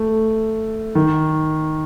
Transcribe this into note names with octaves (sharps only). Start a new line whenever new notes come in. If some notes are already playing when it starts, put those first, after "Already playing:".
Already playing: A3
D#3